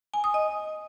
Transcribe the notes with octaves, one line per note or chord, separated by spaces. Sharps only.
G#5
D#6
D#5